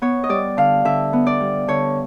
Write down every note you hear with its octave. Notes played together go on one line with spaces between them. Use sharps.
B3 C#5
D#5
G3 D5
D3 F5
D3 E5
B3
D5
G3
D3 C#5